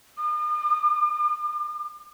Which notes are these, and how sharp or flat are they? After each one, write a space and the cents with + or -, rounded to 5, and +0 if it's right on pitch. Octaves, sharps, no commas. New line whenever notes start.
D#6 -45